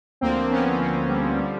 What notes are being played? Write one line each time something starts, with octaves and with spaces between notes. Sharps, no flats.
D2 D3 F3 A#3 C4
B3 C#4
B3
A#3 C4
G3
D3 F3 G3